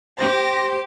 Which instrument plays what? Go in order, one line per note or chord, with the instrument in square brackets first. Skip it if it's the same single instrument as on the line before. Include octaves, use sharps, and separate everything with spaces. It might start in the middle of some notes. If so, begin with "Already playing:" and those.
[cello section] G4 [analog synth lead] C5 [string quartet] A#6